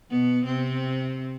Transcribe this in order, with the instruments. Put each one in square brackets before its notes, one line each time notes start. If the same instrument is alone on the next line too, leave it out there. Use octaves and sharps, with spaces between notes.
[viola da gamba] B2 B3
C3 C4